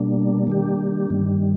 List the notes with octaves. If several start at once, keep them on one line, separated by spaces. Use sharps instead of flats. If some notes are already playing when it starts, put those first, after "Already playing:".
Already playing: B2 G3 A#3 D4
D#3 G3 A#3 D4 G4
G2 D#3 G3